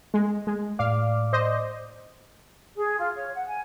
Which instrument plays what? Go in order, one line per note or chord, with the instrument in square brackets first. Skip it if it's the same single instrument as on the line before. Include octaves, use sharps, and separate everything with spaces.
[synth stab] G#3
G#3
[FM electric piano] A2 D5 D6 [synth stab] F5
[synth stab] C5 D#5
[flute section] G#4
F4
C#5
F#5
G#5